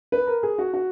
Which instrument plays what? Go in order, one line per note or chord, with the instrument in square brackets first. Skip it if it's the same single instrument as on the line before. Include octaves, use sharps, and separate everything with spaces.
[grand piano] B4
A#4
G#4
F#4
F#4